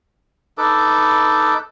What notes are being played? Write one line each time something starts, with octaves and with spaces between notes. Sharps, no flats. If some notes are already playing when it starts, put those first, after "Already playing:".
D#4 A4 B4 D6